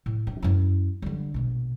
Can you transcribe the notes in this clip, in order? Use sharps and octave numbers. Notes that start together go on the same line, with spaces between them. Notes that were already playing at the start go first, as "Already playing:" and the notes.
A2
G2
F#2 E4
D3 G3
A#1 B2